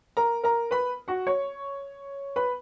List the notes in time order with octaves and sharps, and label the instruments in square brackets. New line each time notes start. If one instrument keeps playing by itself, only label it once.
[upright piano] A#4 A#5
A#4 A#5
B4 B5
F#4 F#5
C#5 C#6
B4 B5